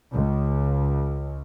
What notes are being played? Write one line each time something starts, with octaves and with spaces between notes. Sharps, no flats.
C#2